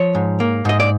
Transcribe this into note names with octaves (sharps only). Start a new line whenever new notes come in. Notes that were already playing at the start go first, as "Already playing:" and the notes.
Already playing: F3 C#5
G#2
A#3
G#2 D#5
D5